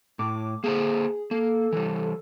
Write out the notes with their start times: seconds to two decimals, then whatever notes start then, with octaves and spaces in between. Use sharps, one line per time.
0.19 A2 D6
0.64 A#3 G#4 A4 C5
1.31 A#3 A4
1.72 E3 G3